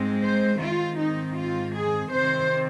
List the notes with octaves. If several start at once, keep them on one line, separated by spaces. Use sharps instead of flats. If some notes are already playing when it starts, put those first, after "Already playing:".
Already playing: G#2 G#3 C4
C5
G#2 D#3 C4 F4
D#4
F4
G#4
C3 D#3 C4 C5